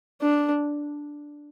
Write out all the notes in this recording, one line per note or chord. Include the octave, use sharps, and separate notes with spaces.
D4